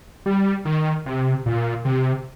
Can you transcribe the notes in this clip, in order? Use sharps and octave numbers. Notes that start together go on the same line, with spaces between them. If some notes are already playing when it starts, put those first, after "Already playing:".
G3
D#3
C3
A#2
C3